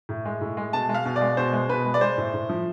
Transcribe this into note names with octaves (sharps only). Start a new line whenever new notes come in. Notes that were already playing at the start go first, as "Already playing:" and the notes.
A2
G#3
A2
G#3
B2 A5
G#3
F5
B2
D5
G#3
B2 C5
G#3
B2 B4
G#3
D5
G#3 C5
A2
A2
F3